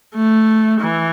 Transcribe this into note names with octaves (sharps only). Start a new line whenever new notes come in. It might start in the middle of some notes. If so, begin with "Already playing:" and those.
A3
E3